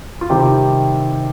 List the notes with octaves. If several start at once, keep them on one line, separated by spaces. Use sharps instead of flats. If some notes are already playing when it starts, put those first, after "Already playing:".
F4
C3 D#3 G3 G4